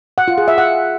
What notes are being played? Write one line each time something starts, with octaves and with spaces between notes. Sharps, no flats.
F#5
F4
G#4
E5
F#5